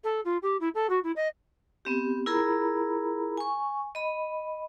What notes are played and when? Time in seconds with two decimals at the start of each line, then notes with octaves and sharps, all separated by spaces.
0.04 A4
0.25 F4
0.42 G4
0.60 E4
0.74 A4
0.89 F#4
1.03 E4
1.16 D#5
1.85 B3 C4 G4
2.26 E4 F4 G#4 A#4 A#5 B5
3.37 G#5 C#6
3.95 D#5 B5